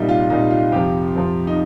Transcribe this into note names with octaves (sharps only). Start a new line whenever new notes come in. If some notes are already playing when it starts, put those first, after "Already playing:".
Already playing: C2 A#2 G3 D#4
F4
C2 A#2 G3 D#4
F4
F2 C3 F3 G4
F2 C3 F3
D#4